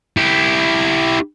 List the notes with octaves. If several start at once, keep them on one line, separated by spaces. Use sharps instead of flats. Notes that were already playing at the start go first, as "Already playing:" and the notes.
E4 G4